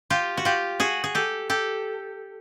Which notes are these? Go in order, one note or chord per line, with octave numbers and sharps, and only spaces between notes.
F4 G4
F#4
F4 G4
F#4 G#4
G#4
G4 A4
G4 A4